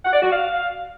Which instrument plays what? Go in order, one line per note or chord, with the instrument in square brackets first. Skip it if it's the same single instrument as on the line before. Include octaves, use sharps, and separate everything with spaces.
[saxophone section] F#5
D5
F#4
F5